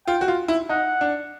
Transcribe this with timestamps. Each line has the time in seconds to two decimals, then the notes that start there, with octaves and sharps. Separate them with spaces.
0.07 F4 G5
0.21 F#4
0.28 F4
0.48 E4
0.69 D#4 F#5
1.01 D4